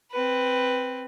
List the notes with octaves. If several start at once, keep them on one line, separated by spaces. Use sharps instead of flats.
C4 B4